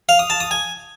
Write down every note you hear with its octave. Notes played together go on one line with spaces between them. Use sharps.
F5
D#6
A5
D#6
G#5